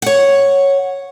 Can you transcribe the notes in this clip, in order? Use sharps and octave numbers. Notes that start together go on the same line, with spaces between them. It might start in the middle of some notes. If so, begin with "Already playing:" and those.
C#5 F#5